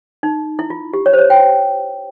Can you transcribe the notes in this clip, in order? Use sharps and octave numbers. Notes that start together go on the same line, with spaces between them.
D#4
E4
F4
G4
C#5
C5
C#5
G5